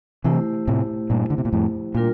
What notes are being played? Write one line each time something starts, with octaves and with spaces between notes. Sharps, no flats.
C3 E3 A3 E4 G4 C5
A2 C3
G2 A#2
D3
C3
A#2
F2 A2
A#2 G3 D4 F4 A#4